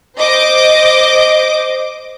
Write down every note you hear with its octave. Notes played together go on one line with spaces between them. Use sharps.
C5 D#5 D6